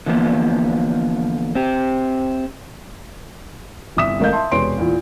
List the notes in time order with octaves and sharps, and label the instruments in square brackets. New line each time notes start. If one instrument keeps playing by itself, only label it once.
[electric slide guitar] D3 E3 F3 A#3 B3
C4 G4
[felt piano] G1 C2 E5 D#6 B6 E7
G#1 A3 A#4 D#5 F5 G6
E5 A5 C6
E1 C3 B4 C#5 C6 D7
E2 A#2